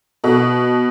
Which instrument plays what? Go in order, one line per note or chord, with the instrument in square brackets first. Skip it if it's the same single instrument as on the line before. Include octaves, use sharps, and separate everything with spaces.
[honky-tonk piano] B2